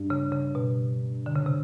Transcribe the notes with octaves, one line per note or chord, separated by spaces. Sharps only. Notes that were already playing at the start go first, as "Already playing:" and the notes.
Already playing: G2
C#3
C#3
B2
D3
C#3
C3